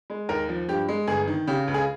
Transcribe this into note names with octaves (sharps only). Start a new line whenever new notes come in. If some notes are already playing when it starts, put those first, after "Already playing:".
G#3
D#2 A#4
F3
G2 G4
G#3
G1 G#4
D#3
C#3 G4
C#2
G#4